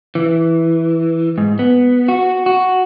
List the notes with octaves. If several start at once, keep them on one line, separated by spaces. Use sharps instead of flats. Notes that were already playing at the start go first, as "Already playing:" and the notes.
E3
G#2
B3
F#4
F#4